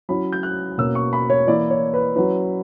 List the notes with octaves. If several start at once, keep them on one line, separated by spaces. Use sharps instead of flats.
F#3 C#4 E4 B5
G6
F#6
B2 A#3 C#4 E6
C#6
B5
C#5
E3 A#3 E4 D5
C#5
B4
F#3 C#4 E4 B4